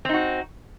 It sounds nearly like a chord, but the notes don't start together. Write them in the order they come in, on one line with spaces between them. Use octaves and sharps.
C4 D#4 F#4